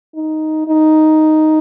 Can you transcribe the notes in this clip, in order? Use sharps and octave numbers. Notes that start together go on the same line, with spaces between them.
D#4
D#4